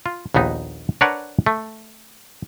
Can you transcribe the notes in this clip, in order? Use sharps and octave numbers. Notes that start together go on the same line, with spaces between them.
F4
A#1 D#2 B3 D#4
D4 A#4 B4 C#5 D5 F#5
A3